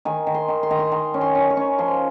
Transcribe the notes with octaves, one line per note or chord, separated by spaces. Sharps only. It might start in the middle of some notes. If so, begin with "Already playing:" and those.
D#3 G#5
D#3
C6
D#3
C6
D#3 A#5
C6
D#3
C#4
C6
C#4
C#6
C#4
F3 C6